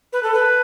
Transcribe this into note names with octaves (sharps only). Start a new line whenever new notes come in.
B4
A4
B4